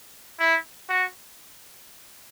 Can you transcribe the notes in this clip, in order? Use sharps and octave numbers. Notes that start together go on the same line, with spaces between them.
E4
F#4